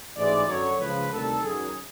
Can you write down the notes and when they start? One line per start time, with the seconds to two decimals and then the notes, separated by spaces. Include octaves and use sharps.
0.16 A1 G#2 E3 G#3 D5
0.48 F#2 D3 F#3 C#5
0.80 C#2 C#3 F3 B4
1.12 D2 C3 D#3 G3 A4
1.43 F#2 D#3 F#3 G#4